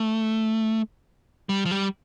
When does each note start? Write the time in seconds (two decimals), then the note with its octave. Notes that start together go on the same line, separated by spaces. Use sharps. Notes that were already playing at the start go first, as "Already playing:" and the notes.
Already playing: A3
1.49 G3
1.65 F3
1.71 G3